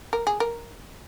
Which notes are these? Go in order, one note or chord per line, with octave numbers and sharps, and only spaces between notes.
A#4
G#4
A#4